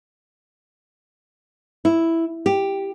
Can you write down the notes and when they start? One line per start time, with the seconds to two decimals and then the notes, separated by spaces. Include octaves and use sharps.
1.85 E4
2.46 G4